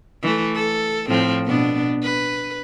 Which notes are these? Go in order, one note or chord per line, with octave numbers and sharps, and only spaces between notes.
E3 A3
A4
A2 F3 C4
B2 B3 D4
B4